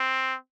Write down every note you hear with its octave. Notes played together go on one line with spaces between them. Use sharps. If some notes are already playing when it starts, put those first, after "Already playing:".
Already playing: C4